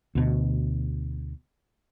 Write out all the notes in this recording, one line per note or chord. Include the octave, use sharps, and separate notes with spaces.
D2 B2